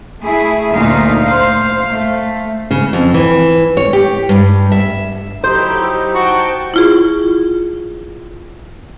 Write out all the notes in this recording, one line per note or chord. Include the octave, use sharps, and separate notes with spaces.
A3 E4 G#4
D2 A#2 A3 D#4 F5
C5 F5
A3
C#3
F2
E3
C#5
G4
G2
E5
F#3 D#4 E4 G4 C5
F#4 G5 A5
E4 F4 G#4